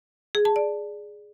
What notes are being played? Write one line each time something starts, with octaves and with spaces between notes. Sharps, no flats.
G#4
A5
D5